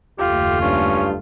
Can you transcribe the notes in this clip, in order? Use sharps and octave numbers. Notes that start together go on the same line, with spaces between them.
F#1 D#2 A3 F4 G4
G2 C#4